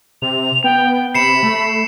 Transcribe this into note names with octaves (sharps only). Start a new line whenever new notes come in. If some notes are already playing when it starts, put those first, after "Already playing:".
C3 F7
B3 G5
C3 B5 C7 C#7 E7
A3